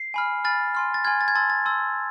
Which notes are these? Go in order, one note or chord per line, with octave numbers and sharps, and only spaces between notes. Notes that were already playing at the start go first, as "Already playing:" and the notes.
Already playing: C7
G#5 B5 F6
G#5 B5 F6 A6
G#5 C6 F6
A6
G#5 C6 F6 G#6
A6
G#6
A5 C6 E6 A6
A6
A5 C6 E6